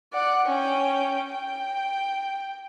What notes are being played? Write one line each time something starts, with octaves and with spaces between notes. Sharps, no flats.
D5 F#5
C#4 G5
G5